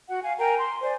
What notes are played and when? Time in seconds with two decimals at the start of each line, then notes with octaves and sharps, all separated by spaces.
0.08 F#4 F#5
0.22 F5 G#5
0.38 A#4 G5 G#5 A#5
0.57 C6
0.82 C5 D5 G#5